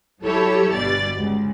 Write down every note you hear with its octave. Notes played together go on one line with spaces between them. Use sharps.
F#3 G3 E4 G4 A4 C#5
G1 B2 G3 D5 A6
C#2